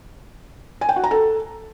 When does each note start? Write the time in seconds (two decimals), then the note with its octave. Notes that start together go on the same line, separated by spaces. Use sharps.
0.81 G#5
0.89 G5
0.96 F#4
1.04 A#5
1.11 A4